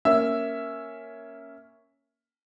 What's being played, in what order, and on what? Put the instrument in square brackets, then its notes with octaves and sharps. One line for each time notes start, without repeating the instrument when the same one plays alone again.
[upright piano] A#3 C#4 E5